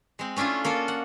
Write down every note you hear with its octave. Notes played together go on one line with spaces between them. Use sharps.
G#3 C4
A3 C#4 D4 E4 F4
A#3 F4 A4
F#5